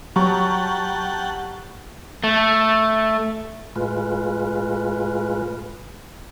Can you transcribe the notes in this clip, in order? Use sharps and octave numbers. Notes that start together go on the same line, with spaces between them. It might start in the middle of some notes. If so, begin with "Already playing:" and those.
F#3 G3 F#5 G5 A5 A#5 C#6
A3
A2 G#3 F4 B4